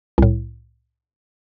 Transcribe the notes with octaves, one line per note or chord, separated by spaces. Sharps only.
C2 A2